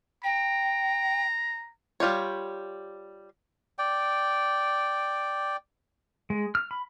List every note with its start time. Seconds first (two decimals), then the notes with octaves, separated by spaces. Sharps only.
0.24 G5 A#5
2.00 G3 F4 G4 C#5
3.79 D5 G5
6.30 G#3
6.55 F6
6.71 B5